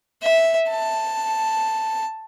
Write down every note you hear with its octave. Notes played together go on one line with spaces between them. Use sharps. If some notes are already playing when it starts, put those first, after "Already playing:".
E5
A5